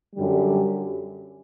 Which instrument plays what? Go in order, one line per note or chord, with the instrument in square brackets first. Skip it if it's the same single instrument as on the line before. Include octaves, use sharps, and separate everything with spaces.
[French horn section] F#2 D3 G3